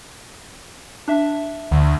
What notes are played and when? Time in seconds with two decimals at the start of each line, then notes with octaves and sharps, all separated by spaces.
1.08 D4 E5
1.71 D2